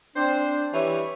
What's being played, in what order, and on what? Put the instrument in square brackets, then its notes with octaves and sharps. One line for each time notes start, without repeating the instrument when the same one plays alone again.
[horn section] C4 C5 [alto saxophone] D4
[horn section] E3 G3 [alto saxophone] C#5